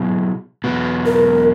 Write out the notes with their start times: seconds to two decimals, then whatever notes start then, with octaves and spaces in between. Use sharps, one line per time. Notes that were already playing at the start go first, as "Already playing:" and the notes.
Already playing: B2 F#3 B3 E4 G#4
0.64 E2 B2 F#3 B3
1.06 A#4